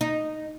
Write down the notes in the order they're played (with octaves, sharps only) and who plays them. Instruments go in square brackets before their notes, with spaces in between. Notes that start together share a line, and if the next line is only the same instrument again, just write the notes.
[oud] D#4